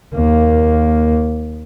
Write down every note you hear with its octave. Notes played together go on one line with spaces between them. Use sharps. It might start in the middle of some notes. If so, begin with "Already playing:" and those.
D#2 A#3